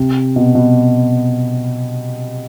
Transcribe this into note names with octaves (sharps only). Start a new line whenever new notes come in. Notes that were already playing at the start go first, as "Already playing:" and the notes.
Already playing: C3
B2
B2